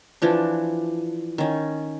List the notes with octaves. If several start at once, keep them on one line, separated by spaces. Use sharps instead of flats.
E3 F3 D4
D#3 C#4